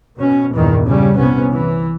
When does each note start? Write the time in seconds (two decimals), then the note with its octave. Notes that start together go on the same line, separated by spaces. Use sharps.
0.17 B2 C#4
0.54 E2 G2 A#2 D#3 E3
0.87 C#3 G3 C#4
1.17 C2 C3 B3 C#4
1.52 E3